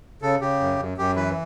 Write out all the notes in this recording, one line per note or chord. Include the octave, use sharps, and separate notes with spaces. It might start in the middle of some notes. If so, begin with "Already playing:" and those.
C#3 A4
C#3 G4
F#2
F#2
F#2 G4
E3 B4